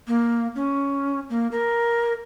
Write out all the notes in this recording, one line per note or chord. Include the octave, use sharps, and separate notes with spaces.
A#3
C#4
A#3
A#4